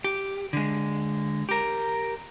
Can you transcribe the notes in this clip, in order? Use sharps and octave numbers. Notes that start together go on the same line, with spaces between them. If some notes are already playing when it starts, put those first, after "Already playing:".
G4
D3 G#3
G4 A#4